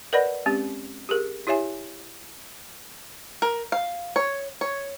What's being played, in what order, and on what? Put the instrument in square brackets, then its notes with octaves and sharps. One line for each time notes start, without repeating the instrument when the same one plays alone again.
[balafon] A#4 B4 D5 D#5 F#5 B5
G#3 C4 C#4 G4
G4 G#4 A#4
E4 G4 C#5 E5 G#5
[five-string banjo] A#4
F5
C#5
C#5